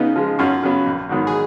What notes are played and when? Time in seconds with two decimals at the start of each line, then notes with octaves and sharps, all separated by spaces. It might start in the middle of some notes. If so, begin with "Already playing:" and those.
Already playing: C#3 B3 D#4
0.16 F3 G#3
0.39 F#2 C#4 F4
0.63 C#3 F#3 B3
0.87 A#1
1.09 G#2 D#3 F#3 B3
1.27 G#4